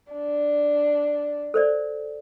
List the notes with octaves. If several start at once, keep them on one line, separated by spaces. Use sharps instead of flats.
D4
A4 C5 D5